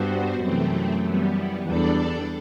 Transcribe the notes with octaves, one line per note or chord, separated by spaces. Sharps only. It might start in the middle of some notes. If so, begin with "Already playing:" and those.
Already playing: G2 G3 B3 F#4 C5
F#2 C3 E3 A3 C4
E3 G3 B3
E2 G3 D4 A4 D5